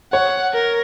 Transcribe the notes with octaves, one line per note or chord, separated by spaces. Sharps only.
C#5 F#5
A#4